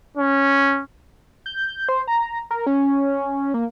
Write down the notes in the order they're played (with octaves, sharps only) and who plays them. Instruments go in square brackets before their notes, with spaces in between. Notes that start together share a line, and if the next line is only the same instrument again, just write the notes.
[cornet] C#4
[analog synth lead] G6
C5
A#5
A#4
C#4
A#3